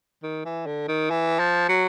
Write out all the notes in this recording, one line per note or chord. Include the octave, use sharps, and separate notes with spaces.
D#3
E3
D3
D#3
E3
F3
F#3